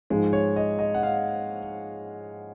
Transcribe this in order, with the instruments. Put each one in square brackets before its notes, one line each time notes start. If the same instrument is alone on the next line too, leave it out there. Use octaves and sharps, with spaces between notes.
[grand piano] G#2 F3 G#3
C#5
D#5
D#5
F#5
F5